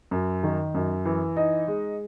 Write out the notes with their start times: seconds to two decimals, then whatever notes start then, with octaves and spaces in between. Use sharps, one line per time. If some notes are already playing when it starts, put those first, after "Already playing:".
0.11 F#2
0.43 D#3
0.75 F#2
1.05 E3
1.36 D#4
1.67 G#3